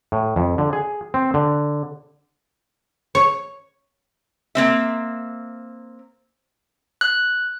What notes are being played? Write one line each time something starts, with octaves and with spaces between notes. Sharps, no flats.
A2
F2
D3
G#4
C4
D3
C#5
A#3 C4 E5
F#6